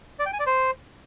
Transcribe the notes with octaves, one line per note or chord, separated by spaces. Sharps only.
D5
G5
G#5
D5
C5